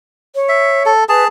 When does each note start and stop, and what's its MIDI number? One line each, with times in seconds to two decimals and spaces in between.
0.35 0.91 73
0.49 0.83 76
0.86 1.04 69
1.09 1.28 68
1.09 1.24 71
1.09 1.28 81